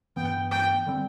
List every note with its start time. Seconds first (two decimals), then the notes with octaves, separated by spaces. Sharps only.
0.16 G2 E3 B3 G5
0.51 G5
0.87 D3 G3 C4